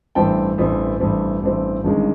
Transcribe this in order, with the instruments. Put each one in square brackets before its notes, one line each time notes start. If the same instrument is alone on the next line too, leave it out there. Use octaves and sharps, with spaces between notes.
[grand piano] A1 G2 E3 A3 C4 G5 A5
A1 G2 E3 A3 C4
A1 G2 E3 A3 C4
A1 G2 E3 A3 C4
G1 G2 D#3 G#3 C#4